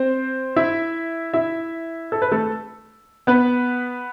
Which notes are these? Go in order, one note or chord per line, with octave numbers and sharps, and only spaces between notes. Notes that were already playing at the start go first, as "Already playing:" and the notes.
Already playing: C4 C5
E4 E5
E4 E5
A4
B4
A3 A4
B3 B4